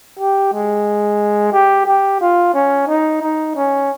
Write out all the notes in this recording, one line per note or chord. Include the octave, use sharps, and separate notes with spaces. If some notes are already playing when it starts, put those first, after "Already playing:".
G4
G#3
G4
G4
F4
C#4
D#4
D#4
C#4